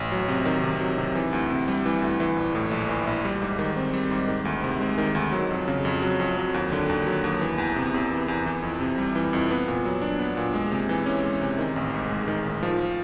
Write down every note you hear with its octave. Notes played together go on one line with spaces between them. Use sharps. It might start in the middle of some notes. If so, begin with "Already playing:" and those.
Already playing: A1
F#3
C3
D#3
C3
F#3
C3
E3
D2
C3
G3
E3
D2
E3
A#1
A2
A#1
E3
A#1
G3
G#2
D#3
C4
G3
G#2
D#3
D2
C3
G#3
D#3
D2
F#3
F2
C#3
F2
F#3
F2
F#3
D#2
D3
D#2
F#3
D#2
E3
E2
C3
E2
E3
E2
E3
F2
C3
G3
E3
F2
B3
A#2
F#3
D4
B3
A#2
G#3
C3
E3
C#4
G#3
C3
D#3
A1
G#2
G#3
D#3
A1
F3